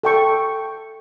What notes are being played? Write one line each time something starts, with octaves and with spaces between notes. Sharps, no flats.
A4 G5 C#6